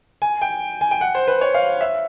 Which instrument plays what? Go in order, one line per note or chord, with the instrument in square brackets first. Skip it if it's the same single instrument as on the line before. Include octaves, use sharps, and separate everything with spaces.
[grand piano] G#5
G5
G#5
G5
F#5
C5
B4
C#5
F5
E5